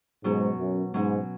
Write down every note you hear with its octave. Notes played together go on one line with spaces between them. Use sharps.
G#2 B2 F#3 C#4
F#2
G#2 B2 F#3 C#4